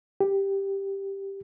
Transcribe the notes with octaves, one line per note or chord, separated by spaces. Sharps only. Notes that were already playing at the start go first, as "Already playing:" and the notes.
G4